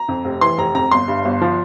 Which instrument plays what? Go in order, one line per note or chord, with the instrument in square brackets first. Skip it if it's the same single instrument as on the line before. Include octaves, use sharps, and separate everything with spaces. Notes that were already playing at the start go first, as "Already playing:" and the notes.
Already playing: [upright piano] A#5
F2
F1
E3 C6
F1 A#5
F2 A#5
G1 C6
G2
G1
F3